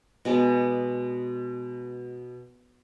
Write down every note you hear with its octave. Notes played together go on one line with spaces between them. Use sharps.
B2 G#3 D5